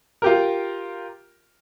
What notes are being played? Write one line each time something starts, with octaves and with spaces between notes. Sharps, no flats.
F4 G4 A#4